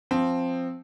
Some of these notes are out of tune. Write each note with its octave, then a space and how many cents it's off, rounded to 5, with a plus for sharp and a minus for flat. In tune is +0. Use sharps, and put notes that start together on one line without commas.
F3 +0 C4 +0